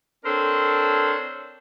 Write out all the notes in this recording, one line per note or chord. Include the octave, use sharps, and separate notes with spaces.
C4 D4 A4 A#4 C5 C#5